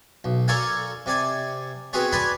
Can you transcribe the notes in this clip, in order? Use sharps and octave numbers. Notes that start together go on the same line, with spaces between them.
B1
A4 A#4 C#5 D5 F5 G#5
C3 D5 G#5
B3 C4 F#4 G#4 C#5
B4 C#5 D5 G#5 B5 C6